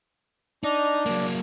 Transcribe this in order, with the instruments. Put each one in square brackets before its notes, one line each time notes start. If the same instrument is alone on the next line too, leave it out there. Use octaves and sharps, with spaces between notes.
[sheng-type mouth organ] D4 [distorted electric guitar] D#4
[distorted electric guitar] F#3 A#3